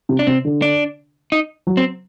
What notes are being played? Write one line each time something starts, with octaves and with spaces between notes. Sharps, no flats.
C3
D4
C3 C4
D3
D4
D#4
F#3
C4